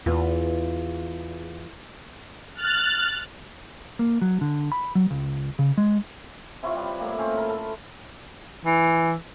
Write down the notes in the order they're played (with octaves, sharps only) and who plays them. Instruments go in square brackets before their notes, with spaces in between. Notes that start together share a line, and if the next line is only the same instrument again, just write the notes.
[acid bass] E2 [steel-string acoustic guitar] E3 F4
[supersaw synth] F6 F#6 A6
[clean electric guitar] A#3
F#3
D3
B5
F#3
C#2
C#3
G#3
[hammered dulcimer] C3 E4 F4 C#5
G3 B4
A2 A#3
C4 C#4
A#4 A5 B5
A4
[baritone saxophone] E3